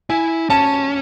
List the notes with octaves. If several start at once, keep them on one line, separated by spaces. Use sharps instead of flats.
E4 G#5
C#4 A5